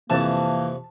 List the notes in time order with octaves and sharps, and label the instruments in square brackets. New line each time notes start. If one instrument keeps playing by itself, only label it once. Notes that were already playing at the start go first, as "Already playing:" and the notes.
[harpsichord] F2 C3 [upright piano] E3 [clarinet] A#3 [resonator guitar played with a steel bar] A5